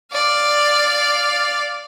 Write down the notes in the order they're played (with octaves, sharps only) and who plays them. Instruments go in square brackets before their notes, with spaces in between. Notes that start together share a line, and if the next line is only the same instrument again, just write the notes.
[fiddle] D5 F5